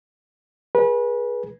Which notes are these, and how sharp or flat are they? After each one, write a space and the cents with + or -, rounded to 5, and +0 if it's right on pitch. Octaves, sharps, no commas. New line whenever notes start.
G#4 +0 B4 -30